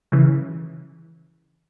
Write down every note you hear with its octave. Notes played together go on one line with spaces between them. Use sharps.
C#3 E3